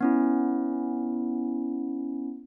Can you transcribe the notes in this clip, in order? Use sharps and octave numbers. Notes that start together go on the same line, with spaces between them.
B3 C#4 E4